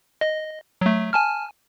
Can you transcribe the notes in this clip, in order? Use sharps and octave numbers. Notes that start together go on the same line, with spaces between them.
D#5
F#3 A3
G#5 A5 F6